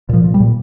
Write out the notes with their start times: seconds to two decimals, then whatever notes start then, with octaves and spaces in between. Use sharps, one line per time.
0.09 A#2 F3
0.24 A#2
0.34 G3
0.40 A#2